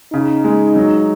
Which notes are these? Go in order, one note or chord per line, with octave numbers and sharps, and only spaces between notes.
C#3 D#4
G#3
F#3